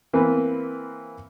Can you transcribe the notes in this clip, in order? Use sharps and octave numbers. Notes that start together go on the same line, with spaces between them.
E3 A#3 C4 B4